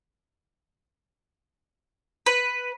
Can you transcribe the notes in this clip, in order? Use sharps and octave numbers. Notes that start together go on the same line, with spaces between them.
B4